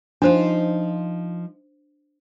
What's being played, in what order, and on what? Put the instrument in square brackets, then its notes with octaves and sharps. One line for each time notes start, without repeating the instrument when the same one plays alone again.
[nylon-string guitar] F3 D#4 F4 [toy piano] D4 C5